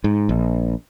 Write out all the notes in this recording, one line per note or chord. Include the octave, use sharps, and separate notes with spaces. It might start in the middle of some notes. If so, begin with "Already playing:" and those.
G#2
A#1